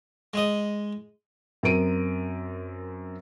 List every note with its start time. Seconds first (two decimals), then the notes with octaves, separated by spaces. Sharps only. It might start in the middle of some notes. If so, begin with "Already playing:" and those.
0.34 G#3 D#5
1.63 F#2 C4 A#4 D7 D#7